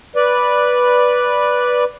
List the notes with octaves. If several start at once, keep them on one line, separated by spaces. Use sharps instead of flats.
B4 D5